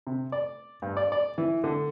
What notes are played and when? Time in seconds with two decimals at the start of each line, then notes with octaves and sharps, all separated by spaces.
0.07 C3
0.32 D5
0.82 G2
0.97 D5
1.12 D5
1.38 E3
1.64 D3